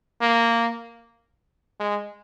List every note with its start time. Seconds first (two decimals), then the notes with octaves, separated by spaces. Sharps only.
0.21 A#3
1.80 G#3